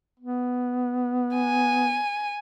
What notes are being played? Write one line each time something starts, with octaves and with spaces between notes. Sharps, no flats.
B3
G#5